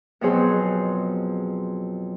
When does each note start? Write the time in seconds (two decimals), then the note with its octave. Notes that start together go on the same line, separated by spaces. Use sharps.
0.21 F2 B2 F#3 G#4 C5